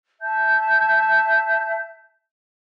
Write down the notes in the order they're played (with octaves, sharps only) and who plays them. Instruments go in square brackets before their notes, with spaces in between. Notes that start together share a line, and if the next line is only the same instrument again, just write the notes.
[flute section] E5 A5 G6